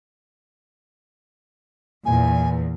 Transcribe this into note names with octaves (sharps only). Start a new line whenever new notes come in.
E2 A#2 G#5